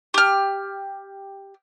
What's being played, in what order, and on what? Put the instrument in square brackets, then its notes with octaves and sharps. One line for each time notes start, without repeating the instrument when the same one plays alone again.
[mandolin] G4 F6